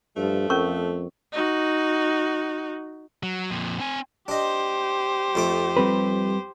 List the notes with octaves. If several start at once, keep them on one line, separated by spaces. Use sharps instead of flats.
G2 F3 A3
F2 C#4 A#4 C#6
D#4 F#4
F#3
F2 A#2
C4 G#5
D4 G4 C5 D#5
F2 A3 D6
G3 C4 B4